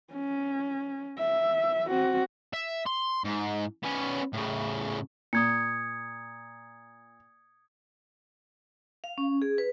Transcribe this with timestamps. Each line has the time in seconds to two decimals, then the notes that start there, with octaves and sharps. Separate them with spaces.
0.13 C#4
1.18 E5
1.89 C4 F#4
2.54 E5
2.87 C6
3.25 G#2
3.84 B3 C#4
4.33 A2 C#3
5.33 A#2 D#6 G#6 C#7
9.04 F5
9.18 C#4
9.42 G#4
9.58 B4